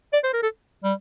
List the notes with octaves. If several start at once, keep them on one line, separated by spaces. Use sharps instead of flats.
D5
C5
A#4
A4
G3